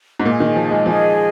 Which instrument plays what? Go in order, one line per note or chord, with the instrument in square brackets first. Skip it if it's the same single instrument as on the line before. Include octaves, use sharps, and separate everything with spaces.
[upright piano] G#2
[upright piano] A#2 [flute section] G#4 D#5 G#5
[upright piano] D#3
F3
G#3
[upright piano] F3 [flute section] G#4 D#5 G#5